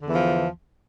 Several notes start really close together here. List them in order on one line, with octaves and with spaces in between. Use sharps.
D3 E2 E3 F3